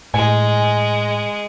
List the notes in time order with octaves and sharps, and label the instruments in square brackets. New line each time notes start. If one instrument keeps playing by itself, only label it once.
[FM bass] A2 [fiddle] G#3 [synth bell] G#5